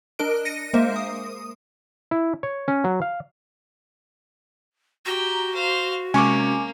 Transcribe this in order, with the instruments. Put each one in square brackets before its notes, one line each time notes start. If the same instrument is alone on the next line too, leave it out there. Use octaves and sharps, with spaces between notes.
[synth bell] D4 A#4 D#5 F#6 D7
A#6 C#7 D#7
G#3 A#3 A#4 C5 E5
D#6
[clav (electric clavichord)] E4
C#5
C#4
F#3
F5
[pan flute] F#4 [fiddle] G4 G5 [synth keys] A#5
[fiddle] C5 F5
[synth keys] C3 G#3 C#4 [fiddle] A#3 [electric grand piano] G#5 C#6 D6